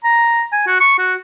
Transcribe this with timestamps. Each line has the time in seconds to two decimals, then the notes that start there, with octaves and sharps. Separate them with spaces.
0.04 A#5
0.52 G#5
0.67 F#4
0.80 C#6
0.99 F#4